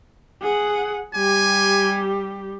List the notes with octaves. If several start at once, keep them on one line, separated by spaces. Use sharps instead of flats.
G#4 F#5
G3 G4 G#5